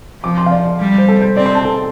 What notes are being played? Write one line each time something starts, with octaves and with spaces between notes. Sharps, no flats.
F3 D6
C6
F5
D5
G3
C5
A4
C5
C4 D5
C6
A5
A4